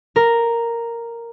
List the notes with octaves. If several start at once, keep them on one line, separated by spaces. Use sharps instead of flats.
A#4